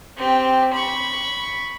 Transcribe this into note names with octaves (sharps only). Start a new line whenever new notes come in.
C4 G4
B5 C#6